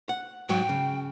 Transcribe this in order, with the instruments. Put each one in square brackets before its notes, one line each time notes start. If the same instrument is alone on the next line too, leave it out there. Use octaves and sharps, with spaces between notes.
[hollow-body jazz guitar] F#5
[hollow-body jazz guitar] G#2 F#3 [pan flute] G5
[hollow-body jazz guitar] C#3